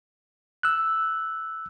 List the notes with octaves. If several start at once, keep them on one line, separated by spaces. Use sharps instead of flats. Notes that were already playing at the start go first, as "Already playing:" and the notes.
E6 F#6